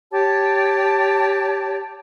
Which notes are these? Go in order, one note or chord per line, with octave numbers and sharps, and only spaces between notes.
G4 C#5 A5